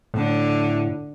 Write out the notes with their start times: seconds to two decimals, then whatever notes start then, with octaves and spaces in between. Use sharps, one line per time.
0.14 A2 D3